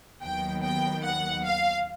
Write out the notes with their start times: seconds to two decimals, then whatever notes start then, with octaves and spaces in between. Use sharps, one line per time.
0.22 D#2 D#3 F#3 B3 G5
0.63 G5
1.04 F#5
1.45 F5